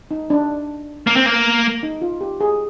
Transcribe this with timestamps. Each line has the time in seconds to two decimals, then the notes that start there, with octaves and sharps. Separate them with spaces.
0.11 D#4
0.30 D4
1.07 A#3
1.16 C4
1.26 A#3
1.83 D#4
2.02 F4
2.21 G4
2.41 G#4